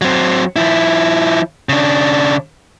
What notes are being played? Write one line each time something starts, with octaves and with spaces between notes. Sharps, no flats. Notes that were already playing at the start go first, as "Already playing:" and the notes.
F#3 C4
F3 E4
C#3 D4